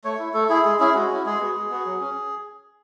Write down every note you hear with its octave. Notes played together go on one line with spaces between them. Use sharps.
A3 C#5
E4
A3 A4
E4 G#4
G#3 G#4
C#4 E4 G#4
G#3 F#4
C#4 E4
G#3 G#4
B3 F#4
G#3
B3 F#4
F#3
C#4